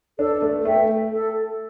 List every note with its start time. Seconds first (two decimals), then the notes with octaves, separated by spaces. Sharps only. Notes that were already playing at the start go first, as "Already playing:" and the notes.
0.19 D4 A4
0.42 A3
0.65 A3 E5 G5
1.11 A4